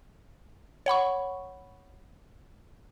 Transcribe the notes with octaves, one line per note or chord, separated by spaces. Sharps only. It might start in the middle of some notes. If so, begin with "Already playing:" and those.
C#5 F#5 B5 C#6